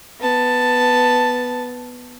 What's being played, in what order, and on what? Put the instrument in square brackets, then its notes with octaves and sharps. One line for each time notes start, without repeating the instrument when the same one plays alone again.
[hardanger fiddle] B3 A5